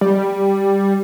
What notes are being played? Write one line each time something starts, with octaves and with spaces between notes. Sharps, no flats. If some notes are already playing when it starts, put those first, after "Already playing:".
G3